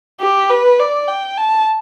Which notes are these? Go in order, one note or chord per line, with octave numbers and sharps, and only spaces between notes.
G4
B4
D5
G5
A5